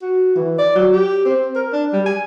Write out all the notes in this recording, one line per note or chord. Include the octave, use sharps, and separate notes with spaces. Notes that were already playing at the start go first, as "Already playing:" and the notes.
F#4
E3
D5
F#3
G4
C4
A#4
D4
G3
G#5